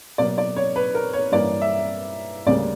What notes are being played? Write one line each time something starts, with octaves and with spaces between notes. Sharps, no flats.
B2 F#3 A#3 D5
D5
C#5
B4
A#4
C#5
G2 E3 A#3 C#4 D5
E5
D2 C#3 G3 A#3 D5